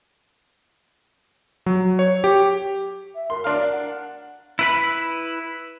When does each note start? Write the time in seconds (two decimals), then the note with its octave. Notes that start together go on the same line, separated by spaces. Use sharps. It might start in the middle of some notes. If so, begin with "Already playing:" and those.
1.66 F#3
1.99 C#5
2.24 G4
3.14 E5
3.30 A#4 C6
3.44 D4 A#4 D5 F5
3.72 F#5
4.59 E4 B4 B5